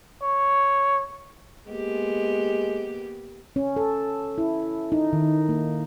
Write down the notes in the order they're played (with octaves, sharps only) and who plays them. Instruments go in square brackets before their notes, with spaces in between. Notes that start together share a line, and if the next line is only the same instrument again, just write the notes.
[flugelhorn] C#5
[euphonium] G#3 [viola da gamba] A#3 B3 G4
[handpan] C#4
A4
E4
D#4
D#3
A#3